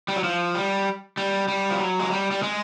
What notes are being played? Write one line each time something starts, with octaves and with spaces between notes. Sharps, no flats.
G3
F#3
F3
G3
G3
G3
F3
F#3
G#3
G3
G3
G#3